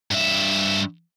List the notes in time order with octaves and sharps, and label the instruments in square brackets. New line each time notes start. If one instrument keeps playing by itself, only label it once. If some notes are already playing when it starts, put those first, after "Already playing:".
[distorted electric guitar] G2 E5